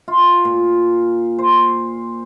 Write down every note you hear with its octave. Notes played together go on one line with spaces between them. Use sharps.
F4
A#2
C5